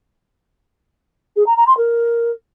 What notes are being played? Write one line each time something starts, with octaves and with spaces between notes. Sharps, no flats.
G#4
A#5
A#5
C6
A#4